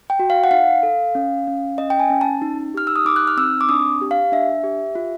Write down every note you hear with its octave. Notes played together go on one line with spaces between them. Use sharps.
G5
F#4
F5
F#5
D#4 F5
A4
C#4
C#4
C#4 D#5
G5
G#5
C#4
A5
D#4
G4 F6
E6
D#6
D#4 D6
F#6
F6
C4 E6
D6
D4 D#6
G4
F5
D4 E5
G4
F4